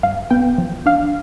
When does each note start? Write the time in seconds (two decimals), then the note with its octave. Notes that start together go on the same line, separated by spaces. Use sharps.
0.03 G2 F5
0.30 B3 G5
0.58 F3
0.86 D4 F5